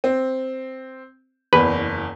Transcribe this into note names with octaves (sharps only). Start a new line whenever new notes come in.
C4
F#1 E2 B4